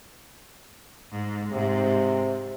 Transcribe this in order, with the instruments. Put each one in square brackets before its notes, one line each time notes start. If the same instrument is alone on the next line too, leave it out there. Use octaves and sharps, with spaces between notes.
[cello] G#2
[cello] G#2 [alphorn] C3